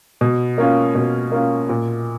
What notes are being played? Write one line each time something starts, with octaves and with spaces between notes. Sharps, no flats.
B2
A#3 C#4 F4
B2
A#3 C#4 F4
A#2